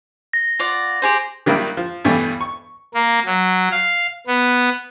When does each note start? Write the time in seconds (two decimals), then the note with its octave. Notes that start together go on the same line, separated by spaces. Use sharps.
0.33 A#6
0.59 F4 D5 F#5
1.02 G4 G#4 C5
1.46 D#3 F#3 G3 A#3 D4 E4
1.77 F3
2.05 G2 B2 E3 G3 A3
2.41 C#6
2.94 A#3
3.25 F#3
3.72 F5
4.27 B3